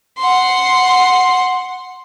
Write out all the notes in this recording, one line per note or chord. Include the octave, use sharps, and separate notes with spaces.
F#5 C6